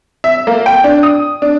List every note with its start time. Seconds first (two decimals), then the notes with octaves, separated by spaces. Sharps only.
0.24 E5
0.47 A#3
0.66 G5
0.84 D4
1.03 D#6
1.42 D4